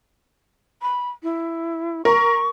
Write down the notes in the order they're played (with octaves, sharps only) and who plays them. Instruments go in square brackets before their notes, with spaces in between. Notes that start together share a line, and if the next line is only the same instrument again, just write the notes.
[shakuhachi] B5
E4
[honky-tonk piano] A#4 [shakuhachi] C#6